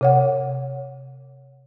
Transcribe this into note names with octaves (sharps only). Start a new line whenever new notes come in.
C3 C#5 F#5